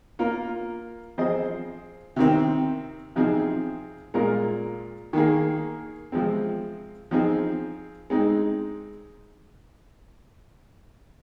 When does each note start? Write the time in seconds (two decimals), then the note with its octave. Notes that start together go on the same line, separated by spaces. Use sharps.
0.19 A#3 F4 A#4
1.18 F3 C4 G#4 C5 D#5
2.16 C3 D#3 C4
3.16 C3 F3 C4 D#4 G#4
4.14 A#2 G#3 F4 A#4
5.13 D#3 A#3 G#4
6.12 C3 F3 G#3 C4
7.11 F3 C4 D#4 G#4
8.10 G#3 C4 D#4